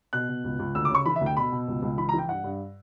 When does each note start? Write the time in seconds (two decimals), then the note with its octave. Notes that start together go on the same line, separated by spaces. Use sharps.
0.13 B2 F#6
0.29 B2
0.44 C#2
0.59 C#2
0.75 D2 E6
0.85 D6
0.90 C#3 C#6
1.06 E3 B5
1.16 E5
1.21 D2
1.26 G5
1.36 B2 B5
1.52 B2
1.68 C#2
1.82 C#2
1.98 E3 B5
2.09 A#5
2.14 E3 G5
2.29 G2 F#5
2.44 G2